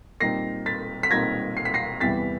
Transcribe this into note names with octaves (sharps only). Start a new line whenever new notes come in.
A#2 G3 C4 D#4 A#6 C7
A6 B6
B6
A#2 G3 C4 D#4 G#6 A#6
C7
B6
A#6 C7
E2 C3 E3 G3 A6 B6